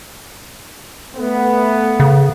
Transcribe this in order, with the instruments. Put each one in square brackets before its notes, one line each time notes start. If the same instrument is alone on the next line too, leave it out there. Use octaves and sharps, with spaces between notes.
[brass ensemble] A3 B3
[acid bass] C#3